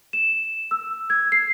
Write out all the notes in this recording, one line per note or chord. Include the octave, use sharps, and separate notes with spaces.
E7
E6
G#6
C7